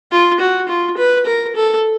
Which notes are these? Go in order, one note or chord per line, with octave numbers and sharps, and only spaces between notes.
F4
F#4
F4
B4
A#4
A4